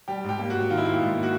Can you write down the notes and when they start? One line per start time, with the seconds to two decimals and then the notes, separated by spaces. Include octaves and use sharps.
0.08 G3 G4
0.24 G#2 G4
0.39 A#3
0.50 F#4
0.55 G#2
0.70 D#3 F4
0.78 E4
0.85 A#3 F4
1.01 G#2
1.16 A#3
1.23 F#4